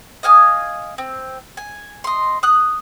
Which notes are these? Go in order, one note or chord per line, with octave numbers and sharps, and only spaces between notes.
D#5 F5 G#5 D#6
C4
G#5
D#5 C6
D#6 F#6